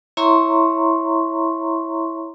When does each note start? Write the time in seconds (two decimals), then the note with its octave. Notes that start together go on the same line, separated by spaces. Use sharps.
0.17 E4 C#5 E5 A#5 C6 C#6